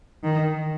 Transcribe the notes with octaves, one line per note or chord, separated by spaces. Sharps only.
D#3